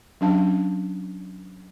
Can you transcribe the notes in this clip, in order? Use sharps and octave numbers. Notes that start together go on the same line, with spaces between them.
F#3 C#4 D4 F5 A5